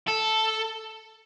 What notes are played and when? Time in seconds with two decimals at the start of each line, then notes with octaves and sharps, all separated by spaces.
0.08 A4